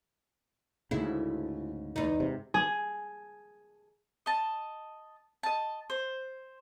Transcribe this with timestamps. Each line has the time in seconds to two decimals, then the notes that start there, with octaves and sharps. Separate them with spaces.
0.91 D2 G#2 C#3 E4
1.96 E2 D#4
2.20 G#2 C3
2.54 G#4
4.26 D#5 A5
5.43 D#5 A5
5.90 C5